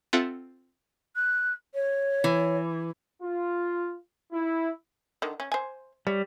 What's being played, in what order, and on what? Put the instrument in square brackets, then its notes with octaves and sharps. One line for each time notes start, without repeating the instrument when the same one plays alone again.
[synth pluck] C4 F4 A4 E5 F#5
[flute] F#6
C#5
[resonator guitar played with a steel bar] E3
[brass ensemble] F4
E4
[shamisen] D3 D#3
C#4
C5 G#5
[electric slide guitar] G3 [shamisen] C#5